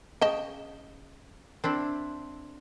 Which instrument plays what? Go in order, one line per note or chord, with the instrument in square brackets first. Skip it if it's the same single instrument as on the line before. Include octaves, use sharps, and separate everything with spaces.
[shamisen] C#3 D#5 A5 [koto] G5
[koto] C4 D4 E4